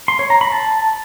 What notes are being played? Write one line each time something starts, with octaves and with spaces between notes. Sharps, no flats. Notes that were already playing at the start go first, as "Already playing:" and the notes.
C6
C#5
A#5
B5
A5